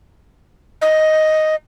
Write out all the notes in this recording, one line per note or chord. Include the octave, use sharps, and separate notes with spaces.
D#5